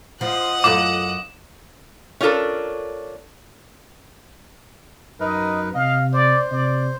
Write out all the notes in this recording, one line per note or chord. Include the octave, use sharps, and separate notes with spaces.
F3 D#5 F#5
F#2 F4 A4 D6
C#4 D4 F4 A4 A#4
F#2 D#4 A#4 B4 D#5
C3 D#5 F5
C5 D5
C3 D5